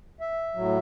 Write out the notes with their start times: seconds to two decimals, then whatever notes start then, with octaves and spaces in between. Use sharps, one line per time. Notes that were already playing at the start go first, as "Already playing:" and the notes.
0.21 E5
0.55 A2 F#3